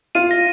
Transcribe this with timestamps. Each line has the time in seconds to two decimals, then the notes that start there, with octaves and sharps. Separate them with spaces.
0.15 F4 D#7
0.31 A#6